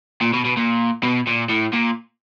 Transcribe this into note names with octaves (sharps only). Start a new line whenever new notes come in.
A#2
B2
B2
A#2
B2
A#2
A2
A#2